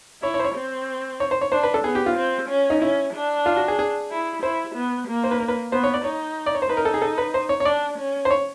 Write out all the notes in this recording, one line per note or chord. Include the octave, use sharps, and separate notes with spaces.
E4 C#5
C#5
C5
C#5
C4
C#5
C5
C#5
D4 C5
B4
A4
B3 G#4
G4
F4
C4
C#4
D#4
C#4 E4
D4
F4
F#4
G#4
G#4
E4
E4 C5
B3
A#3
C5
B4
A#4
B4
B3 C5
C#5
D5
D#4 C#5
D5
C#5
C5
D#4 B4
A#4
A4
G#4
A4
B4
C5
C#5
C#5
D4 D5
C#4
C5
C#5